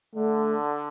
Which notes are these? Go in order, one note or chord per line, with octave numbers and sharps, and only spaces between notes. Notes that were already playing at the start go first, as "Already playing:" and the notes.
D3 A3